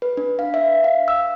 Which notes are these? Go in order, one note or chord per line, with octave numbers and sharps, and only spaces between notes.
B4
D4
F5
E5
F5
E6